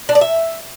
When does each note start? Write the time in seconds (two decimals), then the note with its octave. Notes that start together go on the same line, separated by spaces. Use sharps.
0.09 D4
0.15 D5
0.21 E5